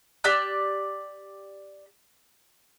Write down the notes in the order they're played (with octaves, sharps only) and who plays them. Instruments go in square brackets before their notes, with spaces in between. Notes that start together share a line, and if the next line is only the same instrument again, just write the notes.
[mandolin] G4 D5 E6 F#6